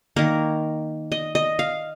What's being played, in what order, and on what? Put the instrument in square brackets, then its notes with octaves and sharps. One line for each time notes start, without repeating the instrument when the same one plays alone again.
[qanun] D#3 A#3 A#4
D#5
D#5
F5